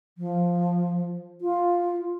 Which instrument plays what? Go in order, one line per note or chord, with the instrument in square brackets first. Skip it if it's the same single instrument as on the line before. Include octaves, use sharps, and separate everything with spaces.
[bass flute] F3
F4